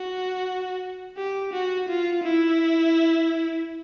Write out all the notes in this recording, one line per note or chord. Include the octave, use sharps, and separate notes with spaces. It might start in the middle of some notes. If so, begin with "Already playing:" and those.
Already playing: F#4
G4
F#4
F4
E4